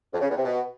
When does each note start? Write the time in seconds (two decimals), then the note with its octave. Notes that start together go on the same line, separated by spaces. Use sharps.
0.13 F2
0.21 C#3
0.29 E2
0.37 C3
0.45 B2